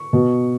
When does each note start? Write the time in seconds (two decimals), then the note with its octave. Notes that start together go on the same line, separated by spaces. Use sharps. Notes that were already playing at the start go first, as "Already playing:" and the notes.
Already playing: C#6
0.13 B2